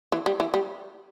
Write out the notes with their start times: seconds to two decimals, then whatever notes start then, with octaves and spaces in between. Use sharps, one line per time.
0.12 E3
0.26 G3
0.40 E3
0.54 G3